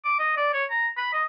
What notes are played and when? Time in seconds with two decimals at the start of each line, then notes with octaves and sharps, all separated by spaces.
0.05 D6
0.19 D#5
0.37 D5
0.54 C#5
0.70 A#5
0.97 B5
1.13 D#5